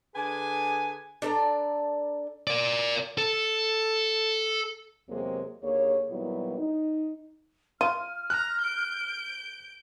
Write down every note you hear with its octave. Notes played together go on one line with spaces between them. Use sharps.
D3 G#4 B4 G#5
D4 A4 D5 A#5
A#4 D5
A4
E2 C3 F#3 G#3 A#3 C4
D#2 D3 A#3 G#4 C#5
A#2 D#3 F#3 G3 B3 E4
D#4
F4 F6 D#7
A#5 F#6
G6 D7